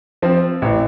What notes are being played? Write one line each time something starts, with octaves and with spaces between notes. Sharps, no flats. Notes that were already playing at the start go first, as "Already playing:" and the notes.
F3 C4
A1